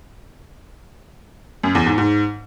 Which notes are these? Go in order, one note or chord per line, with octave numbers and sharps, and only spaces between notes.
F#2
E2
G#2
G#2